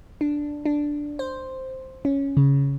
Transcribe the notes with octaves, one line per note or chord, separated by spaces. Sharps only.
D4
D4
C5
C#4
C#3